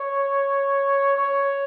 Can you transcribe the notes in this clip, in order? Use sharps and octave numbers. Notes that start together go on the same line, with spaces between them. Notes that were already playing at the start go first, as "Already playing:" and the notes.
Already playing: C#5
C#5